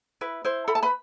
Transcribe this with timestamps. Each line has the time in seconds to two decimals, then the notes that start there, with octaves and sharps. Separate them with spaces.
0.21 E4 B4
0.44 E4 C5
0.68 A4 B5
0.75 A5
0.83 B4 B5